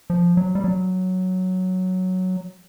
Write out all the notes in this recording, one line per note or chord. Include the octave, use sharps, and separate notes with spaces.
F3
F#3
G3
F#3